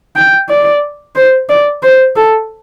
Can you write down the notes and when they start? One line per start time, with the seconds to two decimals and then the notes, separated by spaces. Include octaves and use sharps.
0.16 G5
0.49 D5
1.16 C5
1.49 D5
1.82 C5
2.16 A4